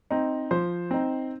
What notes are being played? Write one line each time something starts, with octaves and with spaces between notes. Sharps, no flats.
C4 D#4
F3 C5
C4 D#4